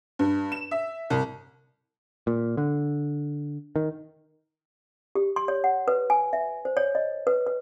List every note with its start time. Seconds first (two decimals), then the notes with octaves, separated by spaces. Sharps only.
0.19 G2
0.52 E7
0.71 E5
1.10 C2
2.27 A#2
2.57 D3
3.76 D#3
5.15 G4
5.36 C6
5.48 C#5
5.64 F#5
5.88 B4
6.10 G#5
6.33 E5
6.65 C5
6.77 C#5
6.95 D#5
7.27 B4
7.47 B4